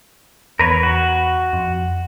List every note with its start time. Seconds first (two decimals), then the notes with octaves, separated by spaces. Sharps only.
0.59 E2 A#4 B4 C#5
0.83 F#4
1.53 F2